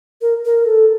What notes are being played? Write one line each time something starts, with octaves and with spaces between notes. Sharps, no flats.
A#4
A#4
A4